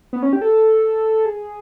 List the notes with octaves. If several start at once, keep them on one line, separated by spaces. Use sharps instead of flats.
B3
C#4
G4
A4
G#4